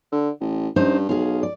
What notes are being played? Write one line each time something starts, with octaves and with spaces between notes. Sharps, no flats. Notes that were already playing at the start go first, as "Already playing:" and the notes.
D3
A1
G2 C#4 D#4 C5
B1 G#4 F5
D5